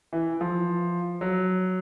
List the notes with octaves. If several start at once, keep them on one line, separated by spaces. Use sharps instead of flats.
E3
F3
F#3